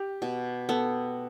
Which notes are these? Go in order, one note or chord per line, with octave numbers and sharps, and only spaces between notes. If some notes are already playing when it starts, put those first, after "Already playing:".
Already playing: G4
B2
B3 A4